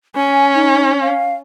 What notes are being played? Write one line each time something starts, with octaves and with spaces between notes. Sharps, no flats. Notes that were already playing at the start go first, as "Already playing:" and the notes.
C#4 G#5
D#4
F5